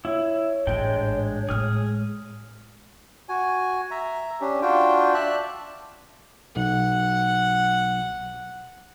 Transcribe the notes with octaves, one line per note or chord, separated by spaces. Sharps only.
E4 C#5
A1 G#2 G#3 D4 G5
A2 G#3 G#4 F6
F#4 G#5
E5 A#5
C#4 D4 G4
D4 F4 F#4 G5
D5 E5 A5 F#6
B1 F#5